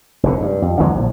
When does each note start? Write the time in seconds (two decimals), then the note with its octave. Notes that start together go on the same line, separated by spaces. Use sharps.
0.23 F1 E2 D3
0.41 G2
0.62 F2
0.80 E2 D3 F#3 G#3
0.96 A#1 A2